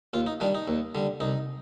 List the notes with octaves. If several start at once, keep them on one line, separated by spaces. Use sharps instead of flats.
D#2 F4
D#4
D#3 G3 D4
D#4
D#2
D3 G3
C2 D#4